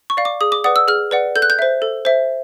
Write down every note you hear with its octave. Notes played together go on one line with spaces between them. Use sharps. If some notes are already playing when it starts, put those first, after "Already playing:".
C#6
D5 F5
D6
G#4 D#6
D6
B4 D5 F#5 D#6
E6
G#4 F6
B4 D5 F#5
A4 G6
F#6
G6
C5 E5
A4
C5 E5